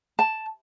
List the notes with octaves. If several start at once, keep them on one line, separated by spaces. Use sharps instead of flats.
A5